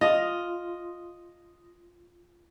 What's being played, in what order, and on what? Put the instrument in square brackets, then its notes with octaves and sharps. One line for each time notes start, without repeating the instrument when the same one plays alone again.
[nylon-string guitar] F4 [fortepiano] D#5